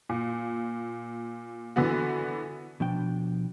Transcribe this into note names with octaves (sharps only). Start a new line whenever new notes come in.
A#2
D3 E3 B3 F#4
B2 F3 D4 G5